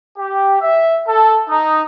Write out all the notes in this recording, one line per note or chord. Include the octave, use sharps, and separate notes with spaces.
G4
E5
A4
D#4